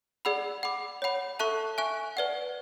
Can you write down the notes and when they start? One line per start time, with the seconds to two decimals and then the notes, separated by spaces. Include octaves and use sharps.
0.25 G#4 D5 F#5 B5 E6
0.63 F#5 B5 D6
1.02 C#5 F#5 B5
1.39 A4 E5 A5 C#6 F#6
1.78 E5 G#5 C#6 F#6
2.17 B4 D5 F#5